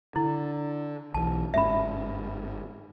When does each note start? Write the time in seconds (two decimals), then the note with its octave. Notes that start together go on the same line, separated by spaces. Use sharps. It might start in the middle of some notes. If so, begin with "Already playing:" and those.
0.16 D3 E4
1.14 B1 E3 A5
1.54 G1 G#2 C#4 E5 B5